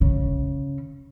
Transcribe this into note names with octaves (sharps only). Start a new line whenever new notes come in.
C#3